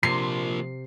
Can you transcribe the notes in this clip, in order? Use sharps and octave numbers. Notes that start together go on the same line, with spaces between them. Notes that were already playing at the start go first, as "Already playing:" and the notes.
C3 F3 A#3 C7